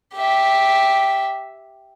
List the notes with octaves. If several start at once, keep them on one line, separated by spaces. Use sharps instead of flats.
G4 E5